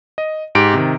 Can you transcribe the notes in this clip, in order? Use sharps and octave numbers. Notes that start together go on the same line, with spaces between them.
D#5
G#2 G4 D7
C3 D#3